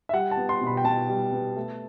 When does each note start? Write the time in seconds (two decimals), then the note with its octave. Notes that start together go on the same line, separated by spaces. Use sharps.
0.09 E5
0.13 G3 F#5
0.31 A5
0.37 B3
0.49 C6
0.61 B2
0.67 B5
0.77 G5
0.84 B2 A5
1.09 G3
1.33 B3
1.56 A3